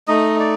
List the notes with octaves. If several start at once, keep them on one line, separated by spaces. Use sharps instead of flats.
A3 D#4 D#5
D5